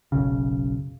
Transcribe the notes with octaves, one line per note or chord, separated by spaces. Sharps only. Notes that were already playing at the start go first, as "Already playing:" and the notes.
F#1 B1 C#3